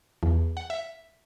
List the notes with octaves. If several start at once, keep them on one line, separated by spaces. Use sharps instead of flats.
E2
F#5
E5